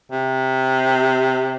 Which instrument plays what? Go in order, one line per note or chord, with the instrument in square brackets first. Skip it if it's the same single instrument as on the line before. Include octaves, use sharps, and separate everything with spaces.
[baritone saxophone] C3